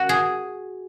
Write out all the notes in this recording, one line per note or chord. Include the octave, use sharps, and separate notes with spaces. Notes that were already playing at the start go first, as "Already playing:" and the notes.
Already playing: F#4
G#4